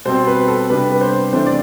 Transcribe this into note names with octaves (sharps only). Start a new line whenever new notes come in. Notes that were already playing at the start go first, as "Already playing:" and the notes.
B2 G3 C4 C5
B4
A4
C3 G3 B3 D4 B4
B4
C5
C3 E3 A3 D4 C5
D5